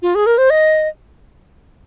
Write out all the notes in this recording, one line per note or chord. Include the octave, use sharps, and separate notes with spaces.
F4
G#4
A#4
C5
D#5